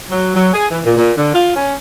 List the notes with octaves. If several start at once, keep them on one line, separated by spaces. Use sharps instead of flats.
F#3
F#3
G#4
E3
A#2
A#2
D3
F4
C#4